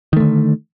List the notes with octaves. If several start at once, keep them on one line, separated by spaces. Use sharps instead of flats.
D3 D#3 A3